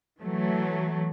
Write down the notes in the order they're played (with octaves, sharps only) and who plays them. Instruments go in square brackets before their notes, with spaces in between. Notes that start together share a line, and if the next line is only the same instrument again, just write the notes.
[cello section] E3 F#3 A3